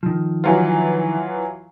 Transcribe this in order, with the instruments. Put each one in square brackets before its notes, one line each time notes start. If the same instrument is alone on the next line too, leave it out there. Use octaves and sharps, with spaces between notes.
[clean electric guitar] D#3 F3
[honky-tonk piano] E3 F#3 F4